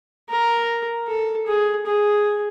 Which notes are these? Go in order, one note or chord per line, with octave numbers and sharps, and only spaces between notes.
A#4
A4
G#4
G#4